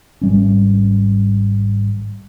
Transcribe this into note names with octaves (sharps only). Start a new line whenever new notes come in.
G#1 G3 C#4